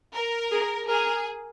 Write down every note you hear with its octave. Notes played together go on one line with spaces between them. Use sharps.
A#4
G#4
G#4 A#4